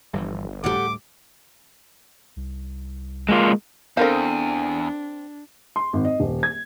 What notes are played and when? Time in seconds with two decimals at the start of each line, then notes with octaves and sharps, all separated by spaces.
0.13 G1 G2 E3 F3
0.64 D2 A2 G3 G4 A4 F#5 D6
2.36 C2
3.29 G#3 A#3 F4
3.97 E2 C4 D4 A4 A#4 C5 F5
5.76 C6
5.93 G#1
6.05 D#5
6.20 D#1
6.43 G#6